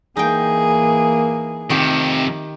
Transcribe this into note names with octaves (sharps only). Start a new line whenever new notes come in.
E3 A#3 D#4 G#4 G5
F2 C3 D#3 G4